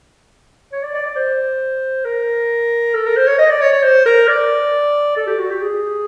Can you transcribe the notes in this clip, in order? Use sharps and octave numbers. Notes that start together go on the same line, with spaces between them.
C#5
D5
D5
D5
C5
A#4
A4
A#4
C5
C#5
D#5
D5
C#5
C#5
C5
A#4
D5
A4
G4
F#4
G4
G#4